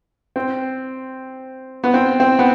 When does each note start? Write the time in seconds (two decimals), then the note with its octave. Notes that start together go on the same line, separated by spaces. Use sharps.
0.36 C4
1.84 B3
1.94 C4
2.20 C4
2.39 B3